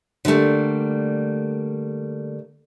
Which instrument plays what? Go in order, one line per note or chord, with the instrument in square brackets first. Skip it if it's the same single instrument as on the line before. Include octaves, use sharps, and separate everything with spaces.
[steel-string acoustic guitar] D3 F#3 G3 A3 A#3